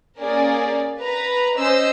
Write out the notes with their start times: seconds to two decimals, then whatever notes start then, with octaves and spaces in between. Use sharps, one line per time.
0.20 A#3 C#4 G#4 A#4 D5
1.03 B4 A#5
1.57 C#4 C5 D#5 E6